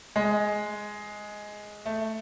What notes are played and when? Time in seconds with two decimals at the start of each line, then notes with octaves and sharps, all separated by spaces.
0.16 G#3
1.86 A3